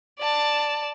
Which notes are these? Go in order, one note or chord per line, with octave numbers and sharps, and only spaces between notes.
D5 A5